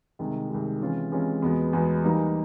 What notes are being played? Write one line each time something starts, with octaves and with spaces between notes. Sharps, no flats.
C2 C3 D#3 G#3
C2 C3 D#3 G#3
C3 E3 G#3 C#4 F4
C3 E3 G#3 C#4 F4
E2 B2 G#3 B3
E2 B2 G#3 B3
E3 G3 A#3 D#4